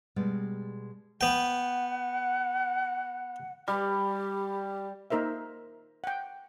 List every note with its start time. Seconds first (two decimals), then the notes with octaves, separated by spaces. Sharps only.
0.16 B2 G3 G#3 G4 D5
1.21 B3 F#5 G5
3.68 G3 G4
5.10 A#3 D#4 A#4 C5 E5
6.04 F#5 G5